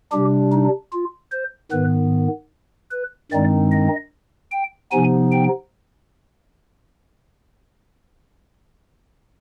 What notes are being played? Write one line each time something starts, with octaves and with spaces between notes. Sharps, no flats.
C3 G3 D4 G4
D#4
F4
C5
G#2 D#3 B3 B4
B4
G2 D#3 G#3 C4 D#4 D5
D#5
G5
C3 F3 B3 D#4 G#5
G5